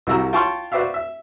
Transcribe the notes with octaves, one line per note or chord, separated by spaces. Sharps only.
C2 C3 G3 F#4 A#5 E6
F4 G5 A5 C6 C#6 F6
F#4 B4 C5 D5 E5 F5
E5